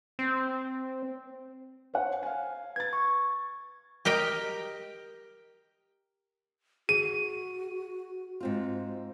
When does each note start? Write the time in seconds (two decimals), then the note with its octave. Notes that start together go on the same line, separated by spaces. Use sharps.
0.19 C4
1.94 C5 C#5 F#5
2.23 F5 G#5
2.76 B4 G#6 A6
2.93 C#6
4.05 G4 A#4 D#5 G5
6.89 F#4 G#4 D#7
8.40 G#2 C4 F4